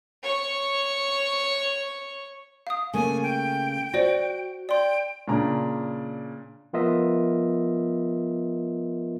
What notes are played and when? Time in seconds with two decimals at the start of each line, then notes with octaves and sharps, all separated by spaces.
0.23 C#5 C#6
2.67 F5 D#6
2.94 C#3 A3 A#3 G#5
3.23 G5
3.94 F#4 C5 D5 A#6
4.69 D5 G5 C6
5.28 A#2 C#3 D4 A#5
6.73 F3 B3 F4 A#4 D#5 E5